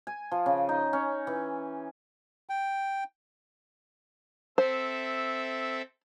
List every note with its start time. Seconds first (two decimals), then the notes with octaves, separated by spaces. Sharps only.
0.07 G#5
0.32 F3
0.46 C#3
0.69 D#4
0.93 C#4
1.27 E3
2.49 G5
4.58 C4 A4 C5 E5